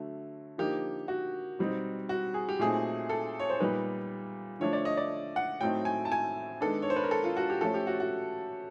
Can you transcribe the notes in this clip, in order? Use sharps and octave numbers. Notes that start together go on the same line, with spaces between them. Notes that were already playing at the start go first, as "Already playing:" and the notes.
Already playing: D3 F#3 A3
D3 F3 A#3 D#4 G4
F#4
B2 G3 C4 D#4
F#4
G#4
G4
A#2 F#3 A3 C4 D#4 G#4
A4
C#5
C5
A#2 G3 B3 D#4 B4
D3 F3 A3 D4 C#5
D5
D#5
D5
F#5
A2 F#3 A3 C4 D#4 G5
G#5
A5
G#5
D#3 G#3 B3 D4 A4
C#5
C5
B4
A#4
A4
F4
F#4
G4
F3 A3 C#4 A4
G4
F#4
F#4